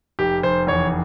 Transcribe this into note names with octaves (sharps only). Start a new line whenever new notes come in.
F1 G4
F1 C5
E2 C#5